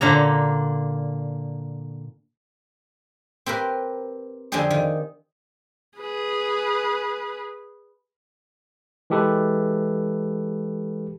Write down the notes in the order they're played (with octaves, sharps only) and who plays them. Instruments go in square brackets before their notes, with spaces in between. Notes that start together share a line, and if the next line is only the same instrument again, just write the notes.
[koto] A#2 D3 A#3 A#5
[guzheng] C4 G4 A#4 B4
F2 D3 C4 G4 G#4
D#3
[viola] G#4 B4
[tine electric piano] E3 G#3 G4 A4 B4